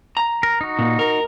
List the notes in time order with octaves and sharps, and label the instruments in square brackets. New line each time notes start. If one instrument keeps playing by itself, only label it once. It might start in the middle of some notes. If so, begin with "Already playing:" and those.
[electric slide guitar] A#5
[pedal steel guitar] A#4
D#4 F#4
[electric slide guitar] A#2
A#4